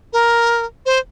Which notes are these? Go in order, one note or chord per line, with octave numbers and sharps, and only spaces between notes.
A#4
C5